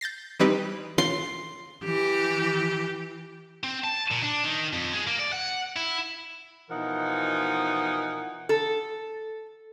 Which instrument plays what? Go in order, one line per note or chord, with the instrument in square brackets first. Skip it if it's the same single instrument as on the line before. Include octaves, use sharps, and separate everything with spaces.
[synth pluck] G6 A6 A#6 C7
E3 G3 C4 D#4 G4 B4
[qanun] C6
[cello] E3 G4
[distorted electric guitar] C4
A5
A#2
D4
D#3
F2
G#3
A#3
D5
F#5
E4
[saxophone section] B2 E3 F3 D#4 A#4 F#5
[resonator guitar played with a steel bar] A4